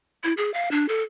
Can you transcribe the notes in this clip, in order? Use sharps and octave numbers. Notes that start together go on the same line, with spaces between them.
E4
G#4
F5
D4
A4